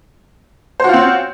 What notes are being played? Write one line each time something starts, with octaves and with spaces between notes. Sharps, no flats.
C4 C#4 F4 F#4 C5